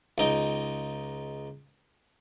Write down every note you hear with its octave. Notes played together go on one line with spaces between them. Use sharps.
C#2 D#4 G5